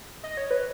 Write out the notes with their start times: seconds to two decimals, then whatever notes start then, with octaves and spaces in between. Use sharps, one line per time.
0.24 D#5
0.37 C#5
0.51 B4